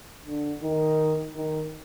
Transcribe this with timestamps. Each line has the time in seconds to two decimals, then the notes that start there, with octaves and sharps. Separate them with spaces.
0.26 D3
0.62 D#3
1.35 D#3